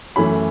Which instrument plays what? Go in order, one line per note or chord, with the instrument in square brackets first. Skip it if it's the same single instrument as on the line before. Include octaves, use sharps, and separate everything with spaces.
[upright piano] F#2 E3 A3 B5